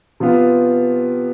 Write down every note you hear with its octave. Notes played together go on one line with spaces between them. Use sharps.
C3 F3 B3 F4